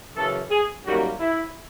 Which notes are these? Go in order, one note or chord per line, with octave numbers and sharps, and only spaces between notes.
F#2 C#3 E3 A4
G#4
F#2 D#3 G3 A#3 F#4
E4